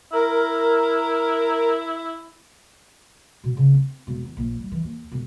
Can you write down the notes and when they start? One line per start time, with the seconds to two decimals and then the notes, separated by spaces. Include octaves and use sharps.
0.13 E4 A#4
3.44 B2
3.57 C#3
3.74 C4
4.07 E1
4.25 E2
4.37 A#1
4.59 G3
4.72 E3
4.84 D#2
5.12 E1